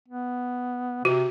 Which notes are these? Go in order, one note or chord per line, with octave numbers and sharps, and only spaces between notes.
B3
C3 F#4